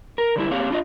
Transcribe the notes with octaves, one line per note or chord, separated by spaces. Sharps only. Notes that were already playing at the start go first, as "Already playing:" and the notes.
A#4
D3 G3 E4
A#3 C4 G4 G#4 C#5 F5
D4 F4 D#5